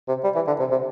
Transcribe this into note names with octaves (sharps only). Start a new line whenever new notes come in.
C3
G3
E3
D3
C3
C3